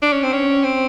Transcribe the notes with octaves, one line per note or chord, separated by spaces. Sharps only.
D4
C#4
C4
C#4
C4